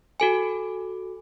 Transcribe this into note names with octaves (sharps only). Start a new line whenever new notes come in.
F#4 A4 G#5